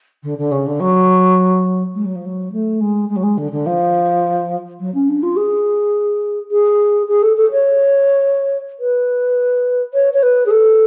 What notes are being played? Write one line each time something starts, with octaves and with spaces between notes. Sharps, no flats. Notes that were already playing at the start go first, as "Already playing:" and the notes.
D3
D3
C#3
D3
F#3
G#3
F#3
F3
F#3
A3
G#3
G#3
F#3
G#3
D3
D3
F3
F#3
C#4
D4
F4
G#4
G#4
G#4
A4
A4
C#5
B4
C#5
C#5
B4
G#4
A4